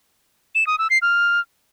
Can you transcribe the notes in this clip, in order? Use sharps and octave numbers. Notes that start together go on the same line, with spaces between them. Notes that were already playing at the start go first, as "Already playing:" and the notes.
E7
D#6
E6
C7
F6